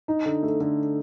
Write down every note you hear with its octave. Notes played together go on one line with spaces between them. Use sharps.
D#4
D3
A3
D3